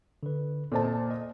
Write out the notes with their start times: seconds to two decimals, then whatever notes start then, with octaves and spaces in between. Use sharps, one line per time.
0.23 D3 B4
0.72 A#2 A4 C5 D#5 A5
1.10 D#5